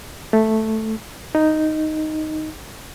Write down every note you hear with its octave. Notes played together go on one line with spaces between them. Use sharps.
A3
D#4